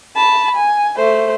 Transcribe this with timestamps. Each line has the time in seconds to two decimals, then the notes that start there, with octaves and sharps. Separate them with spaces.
0.16 A5 B5
0.56 G#5
0.96 A3 C5